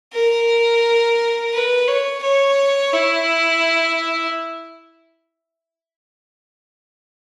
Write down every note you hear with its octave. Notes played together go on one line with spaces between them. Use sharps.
A#4
B4
C#5
C#5
E4